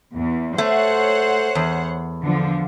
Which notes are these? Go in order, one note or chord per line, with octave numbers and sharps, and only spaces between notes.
E2
A3 C5 C#5 F#5
E2
D3 F3